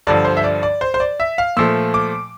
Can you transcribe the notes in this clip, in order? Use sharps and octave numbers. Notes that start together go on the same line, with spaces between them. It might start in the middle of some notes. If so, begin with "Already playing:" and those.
G2 D3 F3 D5
C5
E5
D5
D5
C5
C5
D5
E5
F5
A#2 F3 A3 E6
D6